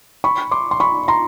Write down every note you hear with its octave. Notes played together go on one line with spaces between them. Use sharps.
B5 C#6
C6 D6
C6
B5 C#6
A#5 C6